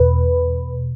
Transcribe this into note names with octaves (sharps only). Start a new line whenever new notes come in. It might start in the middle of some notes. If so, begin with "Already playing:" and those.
Already playing: E2 B2 B4